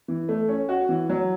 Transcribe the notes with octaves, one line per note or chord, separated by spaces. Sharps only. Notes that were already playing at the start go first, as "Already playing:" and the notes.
E3
A3
C#4
F#4
E3
F#3